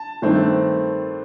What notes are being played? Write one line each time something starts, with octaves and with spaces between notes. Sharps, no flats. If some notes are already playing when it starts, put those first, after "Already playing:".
Already playing: A5
G2 D#3 A3 C4